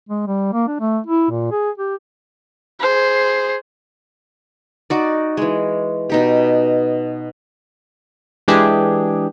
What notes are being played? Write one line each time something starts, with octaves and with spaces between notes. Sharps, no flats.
G#3
G3
A#3
D4
A3
E4
A#2
G#4
G4
G#4 C5
D#4 F#4 D5
E3 G#3
B2 D#4 G4
E3 G#3 D4 G4 G#4